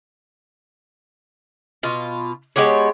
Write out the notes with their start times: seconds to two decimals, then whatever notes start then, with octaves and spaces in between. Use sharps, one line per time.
1.83 B2 F4
2.56 G#3 B3 G4 C#5